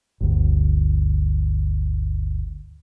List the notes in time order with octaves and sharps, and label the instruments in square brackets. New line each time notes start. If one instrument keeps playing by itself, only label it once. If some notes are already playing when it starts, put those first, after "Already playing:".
[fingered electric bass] G1 D2